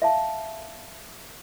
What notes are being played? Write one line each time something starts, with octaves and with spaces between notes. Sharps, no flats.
E5 F5 A5